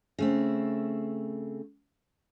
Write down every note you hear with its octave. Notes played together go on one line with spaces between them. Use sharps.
C#3 A3 C4